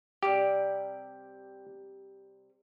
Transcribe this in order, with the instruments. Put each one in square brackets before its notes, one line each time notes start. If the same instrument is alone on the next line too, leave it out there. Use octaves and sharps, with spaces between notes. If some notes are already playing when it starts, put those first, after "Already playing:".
[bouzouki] C3 G3 D5 [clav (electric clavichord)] G4